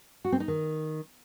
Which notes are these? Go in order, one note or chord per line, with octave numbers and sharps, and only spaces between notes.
F#4
C4
D#4
D#3